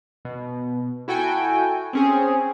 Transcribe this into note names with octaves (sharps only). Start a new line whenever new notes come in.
B2
E4 F#4 A4 G5 G#5
C4 C#4 G#4